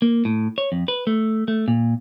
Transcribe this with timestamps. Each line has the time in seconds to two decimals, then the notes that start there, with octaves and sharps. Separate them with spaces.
0.02 A#3
0.25 A2
0.58 C#5
0.72 F2
0.88 B4
1.07 A3
1.48 A3
1.68 A#2